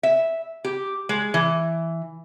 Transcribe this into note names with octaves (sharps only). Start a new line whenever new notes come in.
E5
G4
G#3
E3